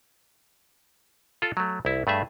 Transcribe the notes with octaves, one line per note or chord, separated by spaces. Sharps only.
F4 A4
F#3 A3
C2 E4
G2 A3 G#4 E5